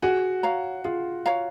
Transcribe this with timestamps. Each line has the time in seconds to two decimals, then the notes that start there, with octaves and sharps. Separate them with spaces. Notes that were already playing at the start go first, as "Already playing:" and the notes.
0.02 F#4 G#4
0.43 C#5 F5 A#5
0.84 F4 G#4
1.26 C#5 F5 A#5